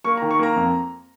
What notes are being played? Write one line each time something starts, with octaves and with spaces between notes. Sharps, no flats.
A#3 C#6
A#5
D#3
C#6
A#3 A#5
F2